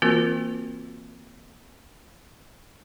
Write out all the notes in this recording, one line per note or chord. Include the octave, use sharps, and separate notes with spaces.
E3 A#3 C4 F4 F#4 A#4